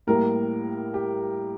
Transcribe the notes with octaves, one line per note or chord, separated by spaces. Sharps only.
A2 G3 A#3 A#4
G4